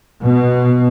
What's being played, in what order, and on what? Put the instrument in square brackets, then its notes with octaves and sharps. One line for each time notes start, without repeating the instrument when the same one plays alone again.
[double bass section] B2